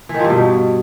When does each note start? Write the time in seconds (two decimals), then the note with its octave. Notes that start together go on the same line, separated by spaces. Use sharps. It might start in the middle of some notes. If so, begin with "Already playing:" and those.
0.09 E3
0.14 D#3
0.19 F3
0.24 G2
0.30 B2